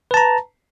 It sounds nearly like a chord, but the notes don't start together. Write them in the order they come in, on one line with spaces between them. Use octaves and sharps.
B4 A5 A#5